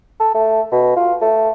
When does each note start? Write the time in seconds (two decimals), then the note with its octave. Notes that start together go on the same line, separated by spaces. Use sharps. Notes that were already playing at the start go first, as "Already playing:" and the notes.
0.20 A4
0.34 A3
0.72 B2
0.96 F4
1.21 A3